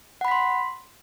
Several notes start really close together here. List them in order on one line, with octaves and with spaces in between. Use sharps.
F#5 B5 B6 C6